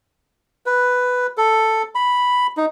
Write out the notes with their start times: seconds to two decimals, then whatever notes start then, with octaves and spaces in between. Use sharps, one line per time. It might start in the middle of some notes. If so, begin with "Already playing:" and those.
0.66 B4
1.37 A4
1.95 B5
2.57 D#4